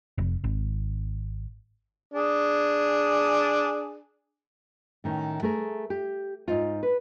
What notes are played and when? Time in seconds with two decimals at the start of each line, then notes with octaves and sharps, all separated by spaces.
0.18 F1
0.44 G#1
2.14 D4 G#4
5.04 A2 D#3 C#4
5.43 A3 G#4 A#4
5.90 G4
6.48 G#2 D#4 F4
6.83 B4